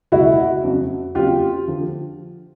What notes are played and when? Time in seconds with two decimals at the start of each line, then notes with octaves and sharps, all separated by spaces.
0.12 C#2 B2 F#3 E4 F#4
0.63 F2 C#3 F#3
1.15 F2 C#3 F#3 F4 G4
1.67 D3 F3